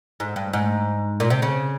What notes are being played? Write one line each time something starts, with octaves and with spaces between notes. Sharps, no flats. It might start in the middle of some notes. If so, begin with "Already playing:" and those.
G#2
G2
G#2
A#2
C3
C#3